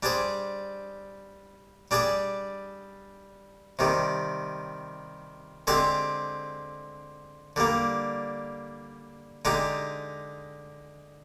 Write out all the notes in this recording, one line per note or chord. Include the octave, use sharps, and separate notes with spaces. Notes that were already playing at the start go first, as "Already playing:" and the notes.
G3 D4 G#4 C5
G3 D4 G#4 D5
C3 D#3 G3
D3 G#3 C4 G4 C5
D3 G3 A#3
D3 G#3 D#4 G4